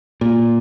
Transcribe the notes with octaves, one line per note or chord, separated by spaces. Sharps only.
A#2